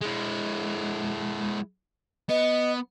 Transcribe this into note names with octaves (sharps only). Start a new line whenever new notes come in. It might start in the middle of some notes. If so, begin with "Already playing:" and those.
G#3 E4
B3 D#5